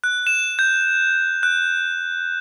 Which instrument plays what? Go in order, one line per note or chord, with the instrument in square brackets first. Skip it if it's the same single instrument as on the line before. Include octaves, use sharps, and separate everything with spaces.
[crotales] F#6
E7
G6
F#6